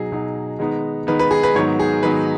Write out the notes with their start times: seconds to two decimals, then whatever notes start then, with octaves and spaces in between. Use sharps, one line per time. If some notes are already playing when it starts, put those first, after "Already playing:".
Already playing: B2 F#3 D#4 G#4
0.12 B2 F#3 D#4
0.59 D#3 G#3 B3 D#4
1.07 D#3 G#3 B3 D#4 B4
1.19 B4
1.31 G#4
1.43 B4
1.55 G#2 D#3 F#3 B3 D#4 C#5
1.79 G#4
2.03 G#2 D#3 F#3 B3 D#4 B4